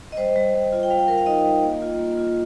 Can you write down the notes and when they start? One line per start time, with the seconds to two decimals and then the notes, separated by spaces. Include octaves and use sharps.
0.12 D#5
0.17 G3 C5
0.36 G3
0.54 G3
0.72 F4
0.83 G5
0.90 G3 F5
0.99 G5
1.08 G3 A#4
1.18 F5
1.26 D#4 D#5
1.45 G3
1.63 A#3
1.82 F4
1.99 A#3
2.17 F4